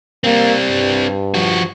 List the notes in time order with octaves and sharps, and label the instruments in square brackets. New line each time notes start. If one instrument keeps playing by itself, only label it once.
[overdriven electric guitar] G3 C4 [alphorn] A#3
[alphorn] G2
[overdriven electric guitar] F3 F#4